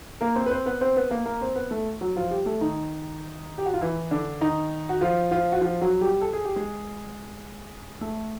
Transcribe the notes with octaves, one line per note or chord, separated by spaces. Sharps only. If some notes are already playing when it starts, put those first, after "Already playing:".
A#3 A#4
C4 C5
B4
C4 C5
B3 B4
C4 C5
B3 B4
A#3 A#4
A#3 A#4
C4 C5
B3 B4
A3 A4
F#3 F#4
F3 F4
G3 G4
A3 A4
D#3 D#4
G4
F#4
F4
E3 E4
D3 D4
D#3 D#4
F#4
F3 F4
F3 F4
F#4
F3 F4
F#3 F#4
G3 G4
A4
G#4
G4
G#3 G#4
A3 A4